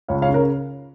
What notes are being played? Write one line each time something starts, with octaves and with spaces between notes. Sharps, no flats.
C#2 C#5 F5
C#5 F5
C#3
A#4 C#5